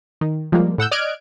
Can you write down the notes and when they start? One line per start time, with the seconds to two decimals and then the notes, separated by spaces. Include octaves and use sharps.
0.21 D#3
0.52 F3 G3 G#3 A#3
0.78 A2 F#5 E6 G6
0.91 D5 D#5 F6 F#6 G#6 D7